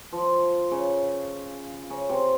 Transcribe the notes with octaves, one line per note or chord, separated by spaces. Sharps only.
F3
C#3
C#3
C3